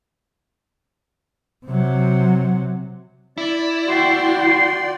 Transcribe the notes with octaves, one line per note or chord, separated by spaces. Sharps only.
C3 F#3
E4 D5
F#4 G5 C6